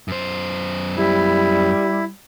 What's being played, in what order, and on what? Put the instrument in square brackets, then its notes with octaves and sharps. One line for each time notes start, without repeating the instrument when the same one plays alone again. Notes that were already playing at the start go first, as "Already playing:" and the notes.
[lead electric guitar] F#2 C5
[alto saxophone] G3 [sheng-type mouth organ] E4